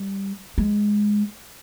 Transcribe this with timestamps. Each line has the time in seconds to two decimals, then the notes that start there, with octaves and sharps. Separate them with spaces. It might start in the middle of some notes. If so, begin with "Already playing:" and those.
Already playing: G3
0.58 G#3